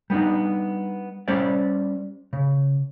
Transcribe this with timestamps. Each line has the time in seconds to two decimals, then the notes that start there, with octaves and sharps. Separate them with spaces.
0.10 G3 B3 D4 D#4
1.28 G3 C#4 G4 C5 D5
2.33 C#3